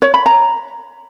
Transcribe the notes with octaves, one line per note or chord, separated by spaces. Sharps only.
C#5
B5
A#5